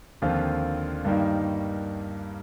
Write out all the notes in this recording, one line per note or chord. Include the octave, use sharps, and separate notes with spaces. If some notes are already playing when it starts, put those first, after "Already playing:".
D#2 D3 F3 C4 F4
G2 D#3 G3 A#3 D#4